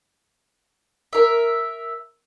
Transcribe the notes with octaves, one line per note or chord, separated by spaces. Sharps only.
A#4 E5